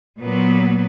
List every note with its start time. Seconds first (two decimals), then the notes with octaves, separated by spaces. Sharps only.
0.20 A#2 F#3 B3